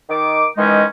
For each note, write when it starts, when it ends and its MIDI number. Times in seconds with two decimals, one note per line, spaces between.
0.09 0.46 51
0.09 0.46 86
0.57 0.84 51
0.57 0.84 52
0.57 0.84 56
0.57 0.84 61
0.57 0.84 63